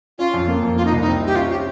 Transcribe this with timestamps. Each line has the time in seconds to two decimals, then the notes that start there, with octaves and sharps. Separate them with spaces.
0.19 C#4 F4
0.34 F2
0.48 A#3
0.63 F2
0.77 A#3 F4
0.85 D#4
0.92 C2
1.01 D#4
1.07 C4
1.22 C3 G4
1.36 C#4 F4
1.51 G4